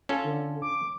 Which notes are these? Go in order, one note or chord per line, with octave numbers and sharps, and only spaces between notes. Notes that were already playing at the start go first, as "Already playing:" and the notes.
C#4 F4 A4
D3
D6